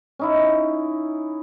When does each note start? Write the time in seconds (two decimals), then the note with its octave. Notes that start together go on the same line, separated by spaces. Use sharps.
0.19 C#4 D#4 E4